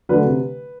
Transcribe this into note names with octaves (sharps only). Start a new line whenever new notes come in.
D3 F#3 A3 B4
C3